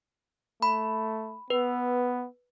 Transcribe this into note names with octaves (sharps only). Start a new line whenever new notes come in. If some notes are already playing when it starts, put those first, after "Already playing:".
A3 B5
B3 B4